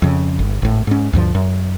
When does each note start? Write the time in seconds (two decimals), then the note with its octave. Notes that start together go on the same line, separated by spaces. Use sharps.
0.02 F2 C#3
0.39 G1
0.62 G#1 A2
0.87 G#2 C#4
1.13 D2 G2 F3
1.35 F#2